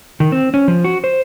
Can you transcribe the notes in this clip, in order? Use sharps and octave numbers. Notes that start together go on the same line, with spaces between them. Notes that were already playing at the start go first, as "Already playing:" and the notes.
D#3
C4
C#4
F3
F#4
C5